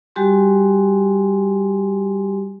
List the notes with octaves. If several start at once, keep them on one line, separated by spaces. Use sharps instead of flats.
G3 F#4 G4 G#5 C6